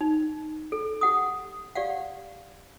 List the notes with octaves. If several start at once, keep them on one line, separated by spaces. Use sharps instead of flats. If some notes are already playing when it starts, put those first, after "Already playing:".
D#4
A4
G4 F#5 D#6
G4 D5 F5 F#5